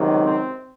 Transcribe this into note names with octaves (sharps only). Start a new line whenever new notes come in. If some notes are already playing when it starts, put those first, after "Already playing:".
Already playing: C#2 C3 D#3 F#3
C4